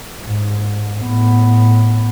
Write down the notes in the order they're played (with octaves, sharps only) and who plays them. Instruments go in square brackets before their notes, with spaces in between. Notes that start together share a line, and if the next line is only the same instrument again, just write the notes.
[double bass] G#2
A2 B3